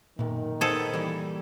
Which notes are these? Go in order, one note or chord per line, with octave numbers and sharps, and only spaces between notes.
B1 F#2 A#2 D#3
B3 D#4 G#4 A4 C5
E3 G3 A#3